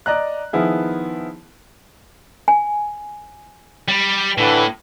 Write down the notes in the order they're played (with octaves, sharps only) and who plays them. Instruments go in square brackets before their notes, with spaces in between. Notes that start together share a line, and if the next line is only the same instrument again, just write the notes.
[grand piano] D5 D#5 A#5 F#6
D#3 F3 B3 E4 G#4
[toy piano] G#5
[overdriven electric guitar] G3
[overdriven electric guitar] A2 [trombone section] D3 E3